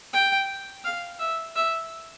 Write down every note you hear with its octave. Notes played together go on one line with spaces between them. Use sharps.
G5
F5
E5
E5